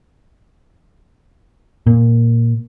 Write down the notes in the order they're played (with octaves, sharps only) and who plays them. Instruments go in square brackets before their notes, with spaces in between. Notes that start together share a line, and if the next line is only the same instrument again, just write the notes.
[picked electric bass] A#2